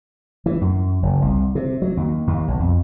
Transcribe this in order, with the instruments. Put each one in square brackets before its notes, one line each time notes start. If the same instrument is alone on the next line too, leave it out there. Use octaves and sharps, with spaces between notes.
[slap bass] E3
F#2
F#1
C2
C3
F#3
D#2
D#2
B1
F2